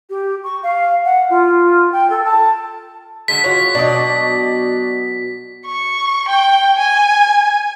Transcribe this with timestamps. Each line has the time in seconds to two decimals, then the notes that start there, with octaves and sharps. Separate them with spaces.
0.10 G4
0.44 C#6
0.63 F5
1.04 F#5
1.30 F4
1.92 G5
2.10 A4
2.24 A5
3.28 D3 F#3 G#3 B6
3.44 G#3 F4 F#4 C#5
3.75 B2 F#3 D4 D5 D#5
5.66 C#6
6.28 G5
6.78 G#5